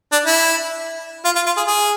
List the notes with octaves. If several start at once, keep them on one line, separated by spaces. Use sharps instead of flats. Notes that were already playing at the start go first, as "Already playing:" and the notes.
D4
E4
F4
F4
F4
G#4
G#4